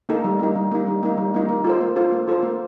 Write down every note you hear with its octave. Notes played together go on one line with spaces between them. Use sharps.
A#3 D#4 A4
G3
A#3 D#4
G3
A#3 D#4
G3
A#3 D#4
G3
A#3 D#4
A#3
F4 A4 C5
A#3
F4 A4 C5
A#3
F4 A4 C5
A#3